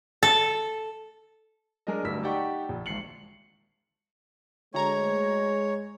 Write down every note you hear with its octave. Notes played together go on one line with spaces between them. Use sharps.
A4
G#3 D4 A#4 D#5
D1 D2 G2 E6 B6
D#4 G4 D5 F#5 G5 C#6
A#1
G#1 G#2 C7 C#7 F#7
D2 G#3 C#5 A#5 G#6